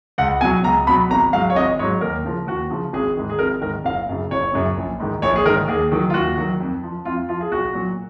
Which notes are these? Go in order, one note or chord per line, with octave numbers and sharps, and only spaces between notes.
C#2 F#5
B2 F#3 G#5
C#2 A#5
B2 F#3 B5
G#1 A#5
G#2 F#3 F5
C#5
G#1 D#5
G#2 F#3 C#5
D#2 A#4
C#3 F3
D#2 F#4
C#3 F3
G#1 G#4
G#2 D#3
G#4
G#1 A#4
G#2 D#3 A#4
F#1 F5
F#2 C#3
F#1 C#5
F#2 C#3
A#1
G#2 D#3
A#1 C#5
G#4
G#2 D#3 A#4
D#2 G#4
D#3 F#3
F4
D#2 F#4
D#3 F#3
F2
F3
F2 F4
F3 F4
G#4
B1 F#4
A#2 F#3